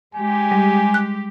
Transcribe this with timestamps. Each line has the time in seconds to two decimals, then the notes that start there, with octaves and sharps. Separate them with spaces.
0.15 G#3 G4 G#5
0.51 G3
0.94 F#6